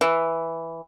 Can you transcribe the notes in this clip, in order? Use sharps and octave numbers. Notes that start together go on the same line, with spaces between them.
E3